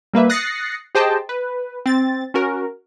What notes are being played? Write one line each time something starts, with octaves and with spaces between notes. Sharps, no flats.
G3 A#3 B4 E5
D#6 F#6 A6 A#6 C7 C#7
G4 G#4 C5 D#5 G5 A5
B4
C4 A6
C#4 F#4 A#4